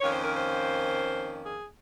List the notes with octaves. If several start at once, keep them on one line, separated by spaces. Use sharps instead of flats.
F2 D#3 A#3 C#4 C#5
C5
A#4
C5
G#4